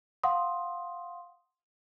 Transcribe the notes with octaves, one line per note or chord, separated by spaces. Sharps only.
F5 F#5 C6 D#6